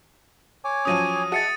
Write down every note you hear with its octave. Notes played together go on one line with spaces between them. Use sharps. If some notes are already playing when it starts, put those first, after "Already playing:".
C#5 G#5 D6
F3 F#3 C#4 D#6 D#7
F#4 G#4 D#5 E5 A5 A6 C#7 D#7